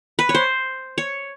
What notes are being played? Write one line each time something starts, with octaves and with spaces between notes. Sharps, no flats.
B4
C#5
C5
C#5